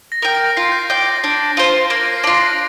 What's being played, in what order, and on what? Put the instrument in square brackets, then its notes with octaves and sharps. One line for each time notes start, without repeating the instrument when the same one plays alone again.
[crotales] A#6
[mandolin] A#4 G5
[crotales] A#6 D7
[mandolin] F4 [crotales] C7
[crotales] G6
A#6
[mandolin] D5 G5
[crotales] A#6
[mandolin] D4
F4 C5
[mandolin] A#3 [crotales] A#6 D7
[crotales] C7
[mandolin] D4 F4
[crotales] A#6